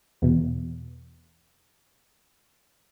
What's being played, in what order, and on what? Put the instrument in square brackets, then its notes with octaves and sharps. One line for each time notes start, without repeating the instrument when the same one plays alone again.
[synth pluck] E2 B2